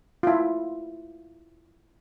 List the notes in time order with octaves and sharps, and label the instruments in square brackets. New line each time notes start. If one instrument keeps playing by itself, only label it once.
[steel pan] E4 F4